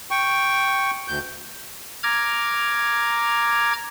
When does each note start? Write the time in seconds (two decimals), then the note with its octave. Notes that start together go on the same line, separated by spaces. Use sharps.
0.11 G5 C#6
1.08 D2 G6
2.03 A#5 D6 F6 G#6